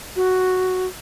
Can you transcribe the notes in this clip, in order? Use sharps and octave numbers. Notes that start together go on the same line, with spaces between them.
F#4